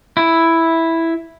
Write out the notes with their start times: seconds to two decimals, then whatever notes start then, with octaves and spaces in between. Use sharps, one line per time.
0.17 E4